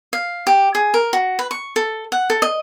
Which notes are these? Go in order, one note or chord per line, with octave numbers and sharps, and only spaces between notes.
F5
G4
G#4
A#4
F#4
B4
C#6
A4
F#5
A4
D#5